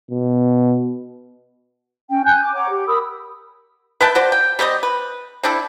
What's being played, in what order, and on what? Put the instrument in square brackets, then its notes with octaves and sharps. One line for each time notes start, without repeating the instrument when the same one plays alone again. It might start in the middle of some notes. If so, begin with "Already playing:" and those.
[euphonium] B2
[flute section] C#4 G5
G#5 F#6 G6
D6
C#5 F#5 A#5 D6
G4
A#4 B5 D#6 E6
[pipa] B4 E5 G5 A5
F#4 C5 D5
G5
G3 C4 G4 D#5
B4
C4 D4 E4 A4